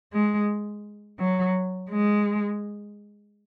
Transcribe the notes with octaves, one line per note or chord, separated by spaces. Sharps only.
G#3
F#3
G#3